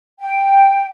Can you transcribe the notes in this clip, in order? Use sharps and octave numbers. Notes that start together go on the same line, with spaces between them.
G5